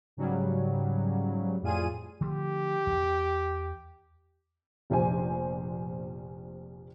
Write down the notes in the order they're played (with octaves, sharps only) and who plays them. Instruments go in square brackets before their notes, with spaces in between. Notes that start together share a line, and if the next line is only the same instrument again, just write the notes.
[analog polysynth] G#2 C#3 F#3 G3
F2 A2 G3 F4 G#4 D#7
[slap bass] D3 F3 A3 [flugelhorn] G4
[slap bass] E2
[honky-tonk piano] F1 A#1 C5 G#5